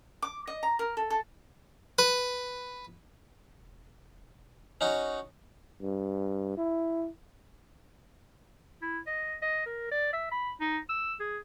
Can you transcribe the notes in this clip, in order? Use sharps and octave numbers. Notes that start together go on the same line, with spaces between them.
D6
D#5
A#5
A#4
A4
A4
B4
E1
C#4 D#4 F#4
G2
E4
E4
D#5
D#5
A#4
D5
E5
B5
D#4
E6
G#4